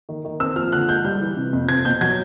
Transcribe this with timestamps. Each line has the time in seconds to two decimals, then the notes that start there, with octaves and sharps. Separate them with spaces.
0.09 D#3
0.25 D#3
0.40 C4 E6
0.56 F3 F6
0.72 D3 F#6
0.89 G#3 G6
1.05 G3 G6
1.21 E3
1.37 C3
1.53 F2
1.69 C4 G#6
1.85 B2 G6
2.01 F#3 G#6